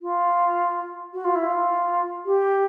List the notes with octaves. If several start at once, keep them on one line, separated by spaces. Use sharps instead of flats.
F4
F#4
F4
E4
F4
G4